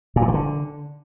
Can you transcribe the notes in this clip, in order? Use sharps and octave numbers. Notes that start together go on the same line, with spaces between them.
A#2
E3
D#3
D3